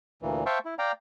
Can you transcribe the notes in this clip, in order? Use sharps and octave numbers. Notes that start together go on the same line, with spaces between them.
D2 A#2 E3
C5 E5 F5 G5 A5 C#6
E4
D5 F5 G5 A#5